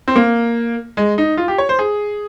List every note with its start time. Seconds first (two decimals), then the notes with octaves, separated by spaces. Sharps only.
0.08 C4
0.16 A#3
0.97 G#3
1.18 D#4
1.37 F4
1.48 G4
1.58 C#5
1.69 C5
1.79 G#4